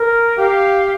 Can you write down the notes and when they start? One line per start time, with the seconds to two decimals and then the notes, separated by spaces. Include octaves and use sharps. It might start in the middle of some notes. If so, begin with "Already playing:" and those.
Already playing: A#4
0.38 G4 F5